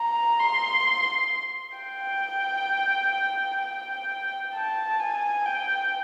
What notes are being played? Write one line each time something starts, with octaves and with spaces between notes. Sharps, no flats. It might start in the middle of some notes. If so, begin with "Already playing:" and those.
Already playing: A#5
C6
G5
G5
A5
G#5
G5